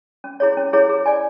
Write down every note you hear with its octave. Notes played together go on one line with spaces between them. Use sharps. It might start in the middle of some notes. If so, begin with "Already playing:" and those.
C#4
E4 G#4 C#5
C#4
E4 G#4 C#5
G#4
D5 G#5